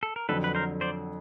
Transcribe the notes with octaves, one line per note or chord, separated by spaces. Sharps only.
A4
A#4
F2 D3 F#3 A4 B4
B4
A#4 C5
C5 D5